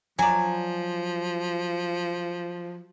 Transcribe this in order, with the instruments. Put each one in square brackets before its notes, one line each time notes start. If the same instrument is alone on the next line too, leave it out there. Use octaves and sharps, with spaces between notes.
[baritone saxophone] F3 [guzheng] F#3 D5 [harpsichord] G#5